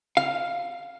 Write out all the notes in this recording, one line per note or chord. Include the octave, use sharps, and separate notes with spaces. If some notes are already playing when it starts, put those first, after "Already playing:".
F5